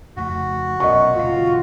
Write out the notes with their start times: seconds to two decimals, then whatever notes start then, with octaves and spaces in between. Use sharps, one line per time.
0.17 F2 C#3 A3 F#4
0.80 B1 F#2 C3 D#5 C#6
1.15 D#1 C#2 F4